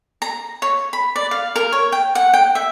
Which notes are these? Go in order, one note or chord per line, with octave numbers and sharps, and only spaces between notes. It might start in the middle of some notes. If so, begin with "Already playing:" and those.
A#5
C#5
B5
D5
F5
A#4
C#5
G5
F#5
G5
E5